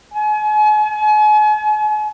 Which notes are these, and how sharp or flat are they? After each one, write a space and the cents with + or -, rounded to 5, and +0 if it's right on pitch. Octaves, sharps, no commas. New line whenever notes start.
G#5 +40